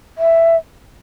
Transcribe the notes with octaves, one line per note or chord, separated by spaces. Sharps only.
E5